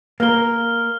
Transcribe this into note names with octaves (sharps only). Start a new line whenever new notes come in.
A#3 A#4 F6 G7